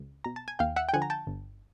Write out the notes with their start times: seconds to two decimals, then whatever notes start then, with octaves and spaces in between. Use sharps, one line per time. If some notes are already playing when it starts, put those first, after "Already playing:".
Already playing: C#2
0.24 B2 A#5
0.36 A5
0.48 G#5
0.59 D#2 F5 G5
0.76 E5 F#5
0.89 G5
0.93 D3 F3 F#5 G#5
1.02 A#5
1.10 G5 A5
1.27 G1